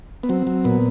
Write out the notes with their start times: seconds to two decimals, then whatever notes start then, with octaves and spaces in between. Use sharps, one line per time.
0.23 B3
0.29 F#3 C4
0.47 F#3
0.64 A#2 B3